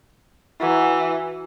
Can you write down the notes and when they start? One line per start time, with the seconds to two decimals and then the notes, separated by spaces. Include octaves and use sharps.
0.61 E3 F#4 A#5